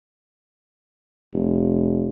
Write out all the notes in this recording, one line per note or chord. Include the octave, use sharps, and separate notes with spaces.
F1